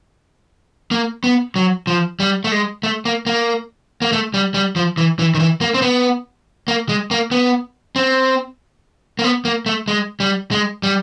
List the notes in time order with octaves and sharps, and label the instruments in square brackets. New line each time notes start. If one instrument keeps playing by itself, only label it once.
[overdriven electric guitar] A#3
B3
F#3
F3
G3
A3
G#3
A3
A#3
A#3
A#3
A3
G3
G3
F3
E3
E3
D#3
E3
A#3
C4
B3
A#3
G#3
A#3
B3
C4
A#3
B3
A#3
A3
G#3
G3
G#3
G3